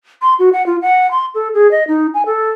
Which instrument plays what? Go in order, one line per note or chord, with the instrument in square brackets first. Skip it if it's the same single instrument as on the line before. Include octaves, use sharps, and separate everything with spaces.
[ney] C6
F#4
F#5
F4
F#5
C6
A4
G#4
D#5
D#4
G#5
A4